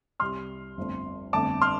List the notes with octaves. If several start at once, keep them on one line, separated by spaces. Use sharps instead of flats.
C2 C3 G3 C6 F6
G1 F2 F3 A3
G1 F2 D3 A3 A5 D6
C6 F6